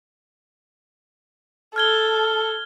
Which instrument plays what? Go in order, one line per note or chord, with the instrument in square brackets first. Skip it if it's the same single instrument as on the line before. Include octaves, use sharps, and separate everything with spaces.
[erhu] A4 [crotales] F6 G#6 G7